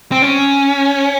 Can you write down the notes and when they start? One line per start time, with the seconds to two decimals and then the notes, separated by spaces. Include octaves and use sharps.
0.12 C4
0.22 C#4